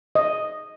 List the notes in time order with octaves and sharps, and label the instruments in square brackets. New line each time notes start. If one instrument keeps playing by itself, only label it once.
[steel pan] D#5